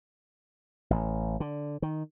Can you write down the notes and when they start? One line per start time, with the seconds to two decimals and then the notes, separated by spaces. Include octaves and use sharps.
0.90 A1
1.40 D3
1.82 D#3